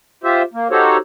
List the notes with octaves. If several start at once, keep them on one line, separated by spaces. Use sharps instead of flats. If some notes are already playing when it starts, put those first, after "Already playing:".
F4 G4 C5 E5
A#3
D#4 F#4 G4 A4 C5 C#5